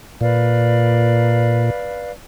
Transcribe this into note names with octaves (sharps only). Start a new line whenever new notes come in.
A#2 B4 D5 F5